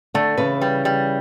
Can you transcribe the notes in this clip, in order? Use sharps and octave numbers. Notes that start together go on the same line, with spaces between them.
D3 A3
C#3 E3 B4
G3
G3